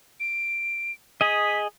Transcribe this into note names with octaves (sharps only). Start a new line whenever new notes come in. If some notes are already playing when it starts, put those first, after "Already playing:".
D7
G#4 D#5 B6